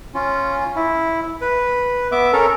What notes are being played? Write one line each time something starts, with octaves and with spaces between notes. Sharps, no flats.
C#4 F4
E4
B4
B3 E5 D6
C#4 A4 A#4